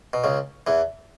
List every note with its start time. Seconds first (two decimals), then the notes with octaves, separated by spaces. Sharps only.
0.13 B2
0.24 C#2 C#3
0.67 E2 E3